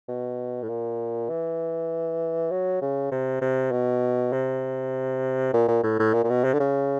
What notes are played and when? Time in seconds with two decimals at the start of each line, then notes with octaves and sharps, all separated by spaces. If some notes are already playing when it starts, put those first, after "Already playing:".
0.08 B2
0.63 A2
0.69 A#2
1.29 E3
2.51 F#3
2.82 C#3
3.11 C3
3.41 C3
3.72 B2
4.32 C3
5.53 A#2
5.68 A#2
5.83 A2
5.99 A2
6.13 A#2
6.24 A#2
6.30 B2
6.44 C3
6.53 D3
6.60 C#3